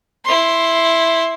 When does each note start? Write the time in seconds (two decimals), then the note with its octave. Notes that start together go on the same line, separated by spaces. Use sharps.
0.25 E4 C6